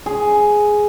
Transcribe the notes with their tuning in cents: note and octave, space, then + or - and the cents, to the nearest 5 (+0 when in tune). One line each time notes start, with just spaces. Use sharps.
G#4 +5